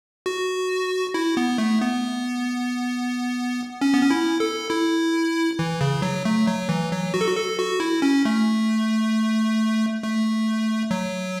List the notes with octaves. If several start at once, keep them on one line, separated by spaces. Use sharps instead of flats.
F#4
E4
B3
A3
B3
C#4
B3
C#4
E4
A4
E4
E3
C#3
F#3
A3
F#3
E3
F#3
F#4
A4
F#4
A4
F#4
E4
C#4
A3
A3
F#3